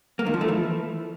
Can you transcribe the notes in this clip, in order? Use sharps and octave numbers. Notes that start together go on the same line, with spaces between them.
A#3
D#3
F3
A3
E3